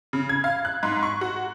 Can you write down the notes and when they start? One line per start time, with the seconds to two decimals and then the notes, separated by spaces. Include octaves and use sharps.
0.13 C#3
0.29 G#6
0.44 F5
0.65 F#6
0.83 G#2
1.03 C#6
1.21 F#4